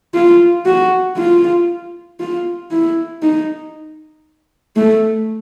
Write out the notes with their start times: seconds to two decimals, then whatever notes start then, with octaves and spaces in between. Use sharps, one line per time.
0.14 F4
0.66 F#4
1.17 F4
2.20 F4
2.71 E4
3.22 D#4
4.76 A3